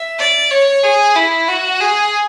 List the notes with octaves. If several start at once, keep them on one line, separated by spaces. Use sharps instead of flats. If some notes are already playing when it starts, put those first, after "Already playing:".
Already playing: E5
D5
C#5
G#4
E4
F#4
G#4